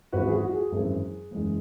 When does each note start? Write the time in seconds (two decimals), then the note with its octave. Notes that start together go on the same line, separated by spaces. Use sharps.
0.12 G#1 F#2 E3 F#4 B4
0.27 G#4
0.32 F#4
0.44 F#4
0.52 G#4
0.72 G#1 F#2 E3 G#4
1.31 F#1 E2 E3 G#3